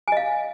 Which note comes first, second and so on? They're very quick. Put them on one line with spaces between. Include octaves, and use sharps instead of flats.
G#5 D#5 F5